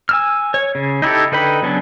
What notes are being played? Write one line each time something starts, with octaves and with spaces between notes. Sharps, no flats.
G#5 E6 F6
C#5
C#3
D#4 E4 G4 A4
D3 D#4 B4 G5 B5
C#3 F#3 B3 C#4 D4